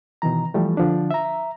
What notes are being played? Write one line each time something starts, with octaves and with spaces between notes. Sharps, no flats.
B2 D#3 E3 A#5
E3 F3 G3 A3
D3 F3 D4
E5 A#5